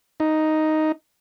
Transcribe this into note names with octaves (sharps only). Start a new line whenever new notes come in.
D#4